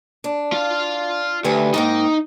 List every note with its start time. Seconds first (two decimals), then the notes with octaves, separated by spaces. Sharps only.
0.24 D4
0.52 F4 F5
1.45 D2 G4 B4 G#5
1.74 G#2 A#3 D#4 G5